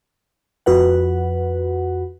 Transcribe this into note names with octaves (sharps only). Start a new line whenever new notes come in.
F2 F#4 B4 F#5